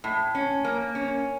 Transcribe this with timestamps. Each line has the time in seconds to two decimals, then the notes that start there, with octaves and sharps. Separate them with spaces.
0.04 A2
0.35 C#4
0.64 A#3
0.95 C#4